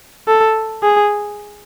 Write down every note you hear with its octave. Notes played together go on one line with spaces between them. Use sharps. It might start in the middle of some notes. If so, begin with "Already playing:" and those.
A4
G#4